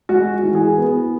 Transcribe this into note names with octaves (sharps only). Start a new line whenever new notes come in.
G#3 F#4
E3
G#4
B3